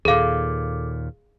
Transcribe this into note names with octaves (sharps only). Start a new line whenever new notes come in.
D#2 A#2 G#4 A4 F5 D6